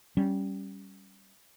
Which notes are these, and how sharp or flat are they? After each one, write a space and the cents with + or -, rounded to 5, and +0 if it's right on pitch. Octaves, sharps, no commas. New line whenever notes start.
G3 -10 C#4 +0